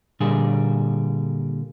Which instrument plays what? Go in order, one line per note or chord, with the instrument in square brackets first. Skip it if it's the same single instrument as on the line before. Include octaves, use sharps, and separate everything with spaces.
[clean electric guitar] A#2 D3 G3 A#3 G#4